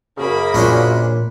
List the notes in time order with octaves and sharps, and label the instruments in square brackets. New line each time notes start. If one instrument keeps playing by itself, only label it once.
[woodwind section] F#2 C#3 [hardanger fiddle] A#3 B5
[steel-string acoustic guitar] A#2 [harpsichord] C#4 D4 C5